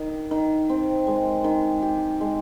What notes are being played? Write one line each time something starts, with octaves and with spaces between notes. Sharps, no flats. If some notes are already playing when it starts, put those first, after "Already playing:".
Already playing: D#3
D#3
C4
G#3
D#3
G4
G#3